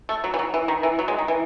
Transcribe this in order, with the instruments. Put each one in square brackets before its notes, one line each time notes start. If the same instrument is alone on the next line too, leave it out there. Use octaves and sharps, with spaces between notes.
[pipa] A3
F#3
E3
F#3
E3
D#3
E3
F#3
G#3
D#3
E3